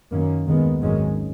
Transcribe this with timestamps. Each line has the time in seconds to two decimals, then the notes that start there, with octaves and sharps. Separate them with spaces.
0.12 F#2 D#3 A#3 C#4
0.46 D#2 D#3 G#3 B3
0.81 G#1 F#2 D#3 G#3 C#4